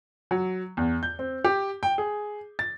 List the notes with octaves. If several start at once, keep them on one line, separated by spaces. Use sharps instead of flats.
F#3
E2
G6
C4
G4
G5
G#4
A6